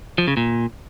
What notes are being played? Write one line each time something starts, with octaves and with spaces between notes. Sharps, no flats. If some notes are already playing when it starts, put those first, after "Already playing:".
F3
C#3
A#2